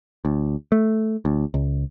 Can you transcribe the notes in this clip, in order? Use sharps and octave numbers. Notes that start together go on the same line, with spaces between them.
D2
A3
D2
C#2